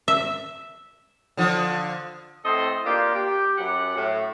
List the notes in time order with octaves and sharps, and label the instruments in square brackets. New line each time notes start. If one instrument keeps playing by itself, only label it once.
[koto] E5
[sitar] D3 F3
[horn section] A2 C4 A4 C5 D#5
A#3 D4 F4 G4
G4
F#2 F#3 G4 B4 F#5
A2